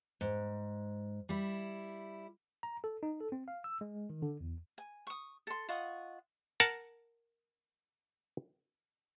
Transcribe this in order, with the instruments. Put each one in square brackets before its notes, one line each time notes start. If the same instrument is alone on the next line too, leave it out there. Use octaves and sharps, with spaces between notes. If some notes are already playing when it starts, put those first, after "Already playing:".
[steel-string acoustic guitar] G#2
G3 E4
[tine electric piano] A#5
A4
D#4
A4
C4
F5
E6
G#3
D#3
D3
E2
[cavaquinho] G#5
C#6 D#6
A4 C6
F4 D#5 F#5 C#6
[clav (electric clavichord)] A#4 F#5 A5